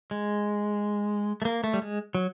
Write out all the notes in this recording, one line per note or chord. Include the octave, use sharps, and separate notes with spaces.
G#3
A3
A#3
A3
G3
G#3
F#3